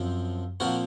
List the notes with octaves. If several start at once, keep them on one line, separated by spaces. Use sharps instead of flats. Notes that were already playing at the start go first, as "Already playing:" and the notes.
Already playing: F#2 F3 C4
A#2 F3 C4 F#4 A#4